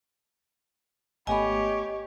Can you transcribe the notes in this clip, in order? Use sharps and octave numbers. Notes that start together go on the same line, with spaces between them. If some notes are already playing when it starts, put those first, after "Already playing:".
G#1 A3 B3 G4 C#5 D#5 G#5 B5